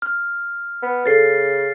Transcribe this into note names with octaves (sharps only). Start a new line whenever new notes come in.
F6
B3
C#3 A4 A6 C7